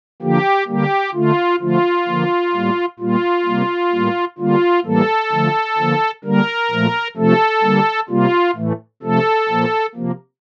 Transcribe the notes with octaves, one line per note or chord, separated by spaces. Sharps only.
D3 F3 A#3 G4
D3 G3 A#3 G4
D3 A3 F4
D3 F3 A3 F4
D3 F3 A#3
A2 G3 A#3
A#2 G3 A#3 F4
C3 G3 A#3
A2 G3 A#3
D3 G3 A#3 F4
A2 E3 G3 A#3 A4
D3 F3 A3
D3 F3 A#3
D3 G3 A#3 A#4
A#2 F3 A3
C3 F3 A3 A4
D3 G3 A#3
C3 G3 A#3 F4
A2 E3 A3
C3 F3 A3 A4
A#2 F3 A#3
C3 F3 A#3